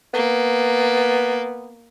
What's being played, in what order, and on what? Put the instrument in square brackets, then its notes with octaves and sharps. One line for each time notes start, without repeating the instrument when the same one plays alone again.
[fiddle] A#3 [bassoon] B3